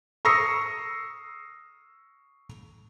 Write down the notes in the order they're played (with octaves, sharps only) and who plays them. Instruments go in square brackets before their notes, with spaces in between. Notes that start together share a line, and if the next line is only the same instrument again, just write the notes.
[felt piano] C#6 D#6 E6 A#6 C7 C#7